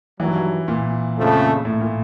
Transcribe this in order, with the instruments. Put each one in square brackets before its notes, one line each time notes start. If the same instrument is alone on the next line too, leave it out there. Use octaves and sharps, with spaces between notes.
[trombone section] G2 D#3 F#3 [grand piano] E3
[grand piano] A#2
[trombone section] F2 C#3 F3 A3
[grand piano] A2
A#2